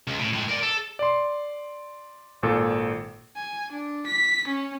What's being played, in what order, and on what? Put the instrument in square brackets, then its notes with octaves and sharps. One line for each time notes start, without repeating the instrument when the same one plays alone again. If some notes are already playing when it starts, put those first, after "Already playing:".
[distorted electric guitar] C#2
A2
A2 G#3
A#4 D5
A4
[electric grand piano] D5 C6
G#1 A#2 A4
[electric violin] G#5
D4
B6
C#4